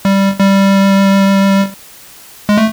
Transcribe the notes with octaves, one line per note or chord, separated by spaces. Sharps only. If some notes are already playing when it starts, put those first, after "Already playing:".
G3
G3
G#3
A3